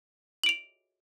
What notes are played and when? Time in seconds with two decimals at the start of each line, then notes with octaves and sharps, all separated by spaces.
0.44 F#7
0.46 D7
0.49 F7